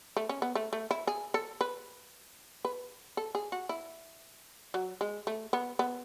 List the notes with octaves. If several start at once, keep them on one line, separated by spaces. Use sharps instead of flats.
A3
C#4
B3
A3
A3
E4
G#4
A4
B4
B4
A4
G#4
F#4
E4
F#3
G#3
A3
B3
B3